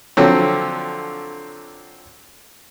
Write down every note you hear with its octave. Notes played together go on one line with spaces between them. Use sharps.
D3 F3 F#3 C4